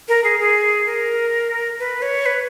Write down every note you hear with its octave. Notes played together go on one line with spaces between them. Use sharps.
A#4
G#4
G#4
A#4
B4
C#5
B4